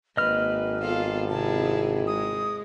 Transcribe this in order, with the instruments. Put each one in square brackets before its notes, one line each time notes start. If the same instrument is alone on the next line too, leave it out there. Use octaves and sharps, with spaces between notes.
[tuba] G#1 [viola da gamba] A#3 [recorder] B4 [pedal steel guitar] D#5 F6
[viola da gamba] B3 F4 A4 [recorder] F5
[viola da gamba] C3 E4 G#4 [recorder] A5
[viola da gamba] G#3 [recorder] D#6